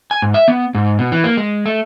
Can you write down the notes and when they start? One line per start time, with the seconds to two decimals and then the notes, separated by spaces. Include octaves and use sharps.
0.11 G#5
0.22 G#2
0.34 E5
0.48 B3
0.75 G#2
0.99 B2
1.12 E3
1.24 A#3
1.37 G#3
1.66 A3